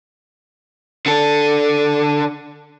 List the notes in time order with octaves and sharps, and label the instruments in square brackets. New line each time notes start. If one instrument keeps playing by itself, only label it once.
[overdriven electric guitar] D3 A4